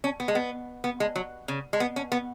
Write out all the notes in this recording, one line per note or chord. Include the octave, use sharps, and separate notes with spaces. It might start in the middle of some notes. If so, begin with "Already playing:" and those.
C#4
B3
G#3
B3
B3
G#3
F#3
C#3
G#3
B3
C#4
B3